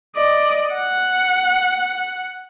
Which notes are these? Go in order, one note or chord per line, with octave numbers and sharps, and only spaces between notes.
D5 D#5
F#5